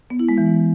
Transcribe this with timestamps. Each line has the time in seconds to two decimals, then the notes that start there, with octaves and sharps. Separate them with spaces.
0.10 B3
0.19 E4
0.29 G#3
0.38 E3